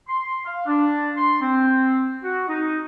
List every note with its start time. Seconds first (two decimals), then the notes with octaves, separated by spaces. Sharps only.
0.08 C6
0.45 F5
0.66 D4
1.17 C6
1.41 C4
2.23 F#4
2.48 D#4